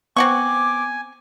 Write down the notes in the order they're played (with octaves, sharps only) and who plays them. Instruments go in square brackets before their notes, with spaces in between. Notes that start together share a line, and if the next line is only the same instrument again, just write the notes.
[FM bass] B3 [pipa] C4 F#5 C#6 [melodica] G#5 [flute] D6